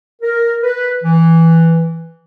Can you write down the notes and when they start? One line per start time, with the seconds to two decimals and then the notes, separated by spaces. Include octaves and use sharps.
0.22 A#4
0.63 B4
1.04 E3